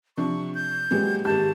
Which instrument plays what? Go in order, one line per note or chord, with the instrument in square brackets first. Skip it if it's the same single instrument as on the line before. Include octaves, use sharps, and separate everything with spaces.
[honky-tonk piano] C3 F3 D4 [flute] C#6
[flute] G6
[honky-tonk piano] A#2 F#3 B3 [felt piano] G#3 G4 G#4
[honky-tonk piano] G#1 G#3 [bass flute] G4 [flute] A5 [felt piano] G6